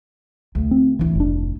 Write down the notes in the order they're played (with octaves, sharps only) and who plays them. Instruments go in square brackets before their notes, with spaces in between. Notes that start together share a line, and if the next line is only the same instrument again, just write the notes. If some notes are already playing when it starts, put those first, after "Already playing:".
[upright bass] D2
[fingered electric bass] C4
[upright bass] D1 E4 [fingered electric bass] E3
[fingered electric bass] F1 D4